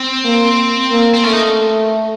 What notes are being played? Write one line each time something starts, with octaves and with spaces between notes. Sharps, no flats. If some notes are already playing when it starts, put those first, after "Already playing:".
Already playing: C4
A#3
A#3
C4
A3 C#4
D#4